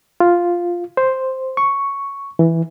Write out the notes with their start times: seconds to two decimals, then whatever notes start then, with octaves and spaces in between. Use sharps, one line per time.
0.20 F4
0.97 C5
1.57 C#6
2.39 E3